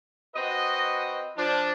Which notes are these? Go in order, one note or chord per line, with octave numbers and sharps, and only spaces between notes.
C4 F#4 B4 D#5
F3 D4